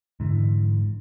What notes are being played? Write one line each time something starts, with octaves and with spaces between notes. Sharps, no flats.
G#2 D3 E3